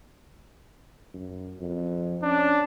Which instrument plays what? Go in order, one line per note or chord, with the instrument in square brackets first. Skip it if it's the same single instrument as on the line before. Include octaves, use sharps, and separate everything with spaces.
[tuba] F#2
F2
[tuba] C#4 [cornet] D4